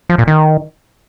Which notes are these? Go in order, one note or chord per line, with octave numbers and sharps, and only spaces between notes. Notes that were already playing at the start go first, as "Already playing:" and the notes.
F3
A#2
D#3